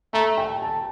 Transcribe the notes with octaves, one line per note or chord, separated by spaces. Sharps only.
A3 A#5
G5
A5